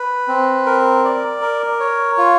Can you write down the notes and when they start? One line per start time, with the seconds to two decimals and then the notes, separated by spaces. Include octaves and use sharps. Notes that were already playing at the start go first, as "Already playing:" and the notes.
Already playing: B4
0.28 C4
0.66 A#4
1.05 D5
1.41 A#4
1.80 C#5
2.18 F4